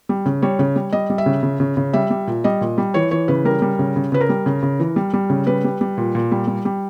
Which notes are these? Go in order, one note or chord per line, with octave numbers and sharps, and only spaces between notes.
G3
C#3
G3 C#5
C#3
G3
G3 D#5
G3
E5
C#3
C#3
C#3
C#3
G3 E5
G3
A#2
G3 D#5
A#2
G3
E3 C#5
E3 C#5
C#3 B4
G3 A#4
G3
C#3
C#3
C#3 B4
A#4
G3
C#3
C#3
E3
G3
G3
C#3
G3 B4
G3
G3
A#2
A#2
G3
G3
G3